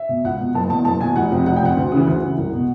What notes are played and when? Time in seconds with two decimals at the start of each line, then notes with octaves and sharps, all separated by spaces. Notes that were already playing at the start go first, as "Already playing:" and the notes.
Already playing: E5
0.09 B2
0.24 C#2 F#5
0.39 B2
0.54 F#1 A5
0.70 E2 B2 A5
0.85 F#1 A5
1.01 E2 B2 G#5
1.16 F1 F#5
1.31 F2 C3
1.46 F1 F#5
1.56 G5
1.61 F2 C3 F#5
1.77 D2
1.92 C#3 E3
2.07 D2
2.22 C#3 E3
2.38 C2
2.53 B2